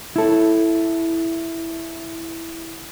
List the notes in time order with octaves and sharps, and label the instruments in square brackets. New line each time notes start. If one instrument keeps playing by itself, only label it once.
[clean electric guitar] E4 A4